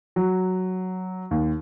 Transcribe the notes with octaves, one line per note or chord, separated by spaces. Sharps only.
F#3
D#2